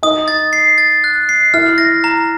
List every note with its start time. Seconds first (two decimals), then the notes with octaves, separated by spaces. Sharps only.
0.03 D#4 D#5 D#6
0.28 A6
0.53 C7
0.78 A6
1.04 F#6
1.29 C7
1.54 E4 E5 F6
1.78 A#6
2.04 A#5